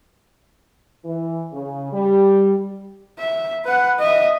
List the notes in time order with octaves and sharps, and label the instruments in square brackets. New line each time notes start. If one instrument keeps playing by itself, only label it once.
[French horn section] E3
C#3
G3
[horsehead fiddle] E5
B4 F#5
D#5 E5